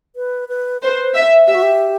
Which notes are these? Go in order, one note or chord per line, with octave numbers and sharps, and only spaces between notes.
B4
B4
B4 C5
E5
G4 E5
F#4
G4